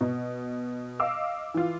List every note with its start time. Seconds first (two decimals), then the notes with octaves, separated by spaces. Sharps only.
0.01 B2
1.00 D#5 F5 D6 E6
1.54 E3 F4